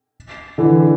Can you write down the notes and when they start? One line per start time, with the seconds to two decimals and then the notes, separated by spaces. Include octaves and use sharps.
0.58 D3 E3